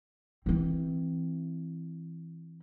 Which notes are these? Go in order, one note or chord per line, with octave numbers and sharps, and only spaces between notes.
E3 C4